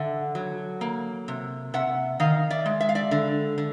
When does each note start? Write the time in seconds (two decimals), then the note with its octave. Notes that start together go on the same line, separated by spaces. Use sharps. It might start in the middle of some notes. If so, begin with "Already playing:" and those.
Already playing: D3 E5 F#5
0.35 F#3
0.81 A#3
1.28 C3
1.74 C3 E5 F#5
2.20 D#3 D#5 F5
2.50 D5 E5
2.66 G#3
2.80 E5
2.89 F5
2.95 D5 E5
3.11 D3
3.58 D3